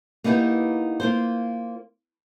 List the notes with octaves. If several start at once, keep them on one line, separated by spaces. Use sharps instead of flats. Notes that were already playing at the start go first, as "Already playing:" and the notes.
A#3 B3 D#4 E4 G4
A#3 F4 C5